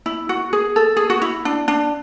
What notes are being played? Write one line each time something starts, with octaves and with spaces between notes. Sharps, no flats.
E4
F#4
G#4
A4
G#4
F#4
E4
D4
D4